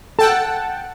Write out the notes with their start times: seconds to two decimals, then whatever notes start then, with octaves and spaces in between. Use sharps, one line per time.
0.19 A4 F#5 G5 A5